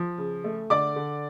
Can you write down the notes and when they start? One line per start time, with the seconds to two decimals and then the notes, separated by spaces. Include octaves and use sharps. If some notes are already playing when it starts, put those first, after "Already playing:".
Already playing: F3
0.18 C#3
0.44 A3
0.70 D3 D5 D6
0.96 D3